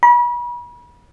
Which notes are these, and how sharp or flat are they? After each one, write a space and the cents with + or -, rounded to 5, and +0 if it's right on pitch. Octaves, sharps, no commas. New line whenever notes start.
B5 -40